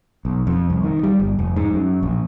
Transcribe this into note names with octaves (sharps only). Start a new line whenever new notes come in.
B1
F2
C2
D#3
G3
G1
F1
G#2
F#2
A#1